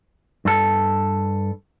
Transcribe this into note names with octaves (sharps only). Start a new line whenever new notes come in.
G2 A4